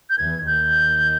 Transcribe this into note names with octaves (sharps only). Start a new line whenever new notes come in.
G6
E2 E3 G#6
D#2 D#3 G6